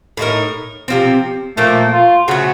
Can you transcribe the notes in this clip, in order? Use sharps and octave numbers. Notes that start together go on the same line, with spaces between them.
A2 A3 D#4 A#4
C3 F3 C4
A#2 F3 A3 A#3
F4
C#3 F3 A3 F#4